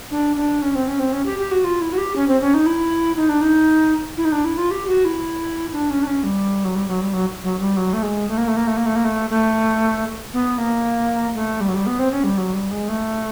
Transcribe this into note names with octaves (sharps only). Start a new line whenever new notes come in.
D4
D4
C#4
C4
C#4
C4
C#4
G4
G4
F#4
F4
E4
F#4
G4
C#4
C4
C#4
D#4
E4
D#4
D4
D#4
E4
D#4
D4
E4
F4
G4
F#4
E4
D4
C#4
D4
C#4
G3
F#3
G3
F#3
G3
F#3
F#3
G3
F#3
A3
G#3
A3
A#3
A3
A#3
A3
A#3
A3
A#3
A3
A3
B3
A#3
A3
G3
F#3
G3
B3
C4
C#4
G3
F#3
G3
G#3
A3